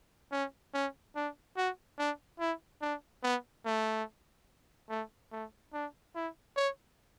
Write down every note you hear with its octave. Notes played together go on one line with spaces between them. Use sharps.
C#4
C#4
D4
F#4
D4
E4
D4
B3
A3
A3
A3
D4
E4
C#5